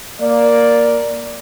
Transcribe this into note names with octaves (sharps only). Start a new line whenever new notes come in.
A#3 D5